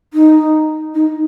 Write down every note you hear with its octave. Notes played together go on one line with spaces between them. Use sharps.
D#4
D#4